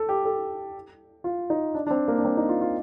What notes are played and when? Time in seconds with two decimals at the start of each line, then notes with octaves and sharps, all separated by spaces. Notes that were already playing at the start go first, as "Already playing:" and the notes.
Already playing: A4
0.09 G4
0.25 A4
1.24 F4
1.50 D#4
1.75 D4
1.87 D4
1.91 C4
2.08 A#3
2.18 D4
2.25 C4
2.37 D#4
2.49 F4
2.61 F4